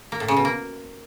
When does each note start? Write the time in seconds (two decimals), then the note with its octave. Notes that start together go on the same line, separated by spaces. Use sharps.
0.12 A#3
0.20 A2
0.28 C#3
0.37 B2
0.45 A#3